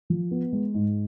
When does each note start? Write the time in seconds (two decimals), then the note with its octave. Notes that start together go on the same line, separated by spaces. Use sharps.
0.10 F3
0.31 B3
0.53 G#3
0.74 G#2